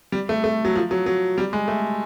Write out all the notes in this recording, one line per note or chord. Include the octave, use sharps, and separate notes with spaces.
G3
A3
A3
F#3
F3
F#3
F#3
G3
G#3
A3